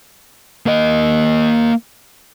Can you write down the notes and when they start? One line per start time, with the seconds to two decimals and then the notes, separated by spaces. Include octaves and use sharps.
0.66 A#3 D#5